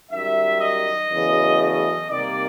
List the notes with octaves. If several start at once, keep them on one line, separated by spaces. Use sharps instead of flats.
F#2 D#3 G3 E5
D#5
E2 C#3 F#3 A3
D#5
C3 D#3 G3 A#3 D5